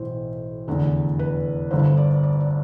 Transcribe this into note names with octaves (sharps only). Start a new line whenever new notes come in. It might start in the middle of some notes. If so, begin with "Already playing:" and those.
Already playing: B1 A2 E3 C5
F1 E2 D3
B4
G1 G2 D3 C5
D5
D5
D5